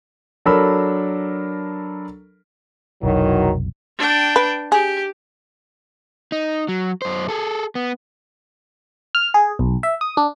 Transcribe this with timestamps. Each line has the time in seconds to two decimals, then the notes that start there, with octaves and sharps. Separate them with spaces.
0.46 F#3 D4 A4 A#4 B5 E6
3.03 F1 B1 D#3 E3 F#3
3.98 D4 G5
4.36 B4
4.72 G4 G#4
6.32 D#4
6.68 F#3
7.02 F#2 C5
7.29 G#4 A4
7.75 B3
9.15 F6
9.34 G#4
9.59 B1
9.83 E5
10.01 D#6
10.17 D4